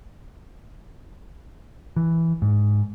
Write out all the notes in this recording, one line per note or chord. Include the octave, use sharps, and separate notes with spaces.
E3
G#2